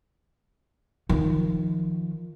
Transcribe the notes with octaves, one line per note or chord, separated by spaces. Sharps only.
D#3 F3